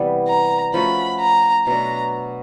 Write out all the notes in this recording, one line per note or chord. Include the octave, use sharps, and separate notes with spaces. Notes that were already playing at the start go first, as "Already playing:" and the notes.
Already playing: C3 E3 G3 B3
A#5
F3 A3 C#4 F#4 B5
A#5
B2 F#3 A3 D4 A#5